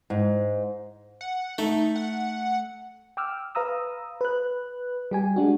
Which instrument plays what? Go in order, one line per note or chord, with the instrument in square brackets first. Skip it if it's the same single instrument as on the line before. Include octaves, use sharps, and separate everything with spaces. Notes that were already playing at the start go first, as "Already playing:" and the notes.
[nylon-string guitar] G#2
[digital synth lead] F#5
[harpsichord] A3 [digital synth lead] D#4
[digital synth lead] F#5
[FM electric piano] G5 D6 E6 F6
B4 F5 A#5 D#6 E6
B4 F#6
G3 G4 G#5
G#3 D4 F#4